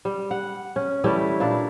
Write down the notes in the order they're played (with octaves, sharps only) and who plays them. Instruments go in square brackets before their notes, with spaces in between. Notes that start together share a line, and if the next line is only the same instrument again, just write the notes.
[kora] G3
F#5
C#4
E3 G3 A3 E4
A#2 D4 E4 D5